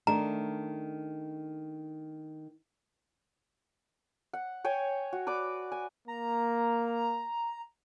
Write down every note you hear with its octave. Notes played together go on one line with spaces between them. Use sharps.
D#3 A3 D4 A#5
F#5
C#5 G5 G#5
F#4
B4 D5 D6
G#5
A#3 A#5